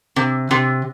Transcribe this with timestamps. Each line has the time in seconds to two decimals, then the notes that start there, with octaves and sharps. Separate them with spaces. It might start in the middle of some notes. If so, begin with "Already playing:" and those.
0.16 C3
0.51 C3